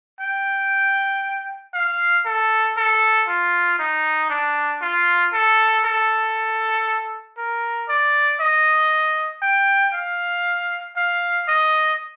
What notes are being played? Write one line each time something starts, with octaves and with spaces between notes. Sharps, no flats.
G5
F5
A4
A4
F4
D#4
D4
F4
A4
A4
A#4
D5
D#5
G5
F5
F5
D#5